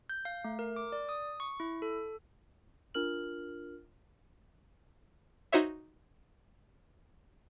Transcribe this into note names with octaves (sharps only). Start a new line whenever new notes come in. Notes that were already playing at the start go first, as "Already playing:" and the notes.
G6
F5
A3
A#4
D6
D5
D#6
C#6
E4
A4
D4 F4 A#4 F6 F#7
D#4 F#4 C5 C#5 E5